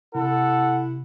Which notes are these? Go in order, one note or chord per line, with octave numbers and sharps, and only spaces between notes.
C3 E4 A4 F#5